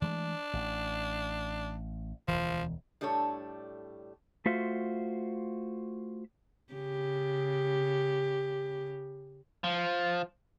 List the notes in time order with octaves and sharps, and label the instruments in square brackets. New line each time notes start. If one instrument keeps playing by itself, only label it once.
[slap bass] E3 G#3 A3 [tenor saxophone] D4
[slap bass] A1
[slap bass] E1 D2 E3 [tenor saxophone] F3
[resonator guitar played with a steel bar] A2 G3 D4 A4 C#5
[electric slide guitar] A3 F4 F#4 C5 E5 F5
[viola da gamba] C#3 G4
[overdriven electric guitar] F3